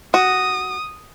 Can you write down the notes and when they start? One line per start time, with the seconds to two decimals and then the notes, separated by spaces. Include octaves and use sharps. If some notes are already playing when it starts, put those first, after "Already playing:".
0.14 F#4 D#6